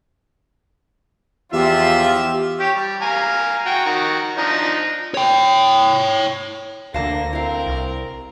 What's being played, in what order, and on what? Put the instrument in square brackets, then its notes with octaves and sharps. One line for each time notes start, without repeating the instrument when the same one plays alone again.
[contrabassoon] E2 [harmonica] F3 E5 [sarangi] F4 [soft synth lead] G4
[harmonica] G4 C#5
G3
F5 G#5 A#5
F#4 G5
D#3 F#4 A#5
F3 D4 D#4
[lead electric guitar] C#5 G5
[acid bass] D2 [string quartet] D3 A#3 A#6 [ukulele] F5 A5
[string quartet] C4 A#4 A#5 [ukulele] E4 F5
[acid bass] C2